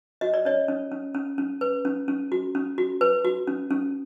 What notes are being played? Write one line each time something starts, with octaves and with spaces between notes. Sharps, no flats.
F#4 D#5
D5
C#4 C#5 D#5
C#4
C#4
C#4
C#4
B4
C#4
C#4
F#4
C#4
F#4
B4
F#4
C#4
C#4